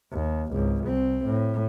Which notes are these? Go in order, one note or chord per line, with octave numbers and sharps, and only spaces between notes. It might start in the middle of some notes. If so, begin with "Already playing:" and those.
D#2
G#1 C#2
C2 C4
A2